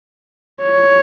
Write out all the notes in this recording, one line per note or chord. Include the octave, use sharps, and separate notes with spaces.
C#5